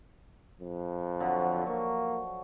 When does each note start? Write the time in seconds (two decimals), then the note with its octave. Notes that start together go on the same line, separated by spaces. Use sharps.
0.61 F2
1.20 D3 F3 F#3
1.67 A#3 C#6